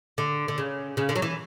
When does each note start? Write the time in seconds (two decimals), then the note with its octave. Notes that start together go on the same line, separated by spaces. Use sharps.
0.18 D3
0.48 D3
0.58 C#3
0.97 C#3
1.09 D3
1.16 F#3
1.22 E3